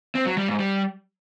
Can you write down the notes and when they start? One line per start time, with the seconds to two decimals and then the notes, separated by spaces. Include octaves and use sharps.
0.15 C4
0.26 F#3
0.37 G3
0.48 G#2
0.60 G3